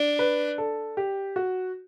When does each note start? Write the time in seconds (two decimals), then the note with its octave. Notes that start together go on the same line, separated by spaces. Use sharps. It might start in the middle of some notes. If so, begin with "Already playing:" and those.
Already playing: D4
0.19 B4
0.58 A4
0.97 G4
1.36 F#4